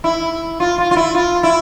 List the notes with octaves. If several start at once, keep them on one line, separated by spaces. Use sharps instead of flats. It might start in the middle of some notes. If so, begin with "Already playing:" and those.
E4
F4
F4
F4
E4
F4
E4